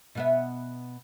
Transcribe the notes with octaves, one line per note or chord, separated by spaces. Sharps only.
B2 B3 E5